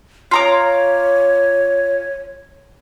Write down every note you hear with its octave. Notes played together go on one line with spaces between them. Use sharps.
F4 C#5 A#5 D6